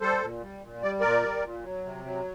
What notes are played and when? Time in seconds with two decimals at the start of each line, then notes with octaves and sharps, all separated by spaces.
0.01 G3 A4 C5
0.21 A#2
0.42 G3
0.62 A#2
0.82 G3 D5
1.00 A#2 A#4 D5
1.23 G3
1.44 A#2
1.63 F#3
1.84 C3
2.05 F#3